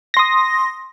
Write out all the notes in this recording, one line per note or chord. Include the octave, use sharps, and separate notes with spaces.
C6 D#6 A#6